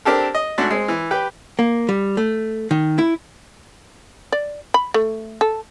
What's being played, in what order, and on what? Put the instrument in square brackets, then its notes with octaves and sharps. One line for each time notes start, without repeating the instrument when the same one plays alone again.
[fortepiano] C4 D4 G4 A4 A#4
D#5
G#2 A3 D4 F#4
G#3 C4
E3
G4 B4 G5
[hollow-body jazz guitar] A#3
G3
A3
D#3
E4
[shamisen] D5
B5
A3
A4